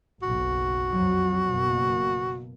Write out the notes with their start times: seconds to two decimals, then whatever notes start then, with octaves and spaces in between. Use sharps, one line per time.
0.22 F#1 B1 F#4
0.93 F2 F#3
1.44 F#1 B2 A#3